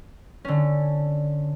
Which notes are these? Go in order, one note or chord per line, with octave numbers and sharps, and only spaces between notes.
D3 C#4